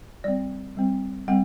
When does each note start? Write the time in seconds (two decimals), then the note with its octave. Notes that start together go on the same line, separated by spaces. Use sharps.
0.24 G3 C4 D5
0.77 G3 C4
1.28 G3 C4 F#5